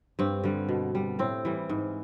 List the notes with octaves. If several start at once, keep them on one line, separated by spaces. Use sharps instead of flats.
G2 C4
D3 G3
B2
G3
A2 C4
E3 G3
G#2